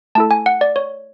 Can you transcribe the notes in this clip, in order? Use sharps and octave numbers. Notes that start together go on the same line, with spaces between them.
A3 E4 A4 A5
G#5
F#5
D5
C#5